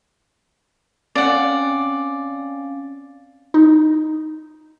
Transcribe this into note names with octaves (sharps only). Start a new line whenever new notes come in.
C4 C#4 D5 F5 F#5
D#4